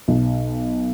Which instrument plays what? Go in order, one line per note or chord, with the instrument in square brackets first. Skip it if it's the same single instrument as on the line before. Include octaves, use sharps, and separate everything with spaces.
[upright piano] B1